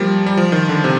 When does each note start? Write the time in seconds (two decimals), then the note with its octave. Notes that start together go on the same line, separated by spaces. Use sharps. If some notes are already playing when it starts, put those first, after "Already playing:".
Already playing: F3 G3 A#3
0.26 G3
0.37 F3
0.52 D#3
0.69 D3
0.84 C3